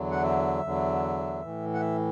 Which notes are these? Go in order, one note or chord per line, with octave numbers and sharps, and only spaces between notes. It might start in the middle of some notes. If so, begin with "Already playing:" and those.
Already playing: E2 D3 F#3
F#5
E5
E2 D3 F#3
A2 E3
F#5
E5